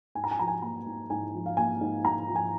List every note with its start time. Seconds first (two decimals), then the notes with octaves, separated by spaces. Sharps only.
0.15 G#2 G#5
0.24 A#5
0.31 G#5
0.39 F3 A#5
0.47 G#5
0.62 A#3 A#5
0.86 G#2
1.10 G#2 G#5
1.34 F3
1.46 F5
1.57 A#3 G#5
1.81 G#2
2.04 G#2 A#5
2.28 F3
2.36 G#5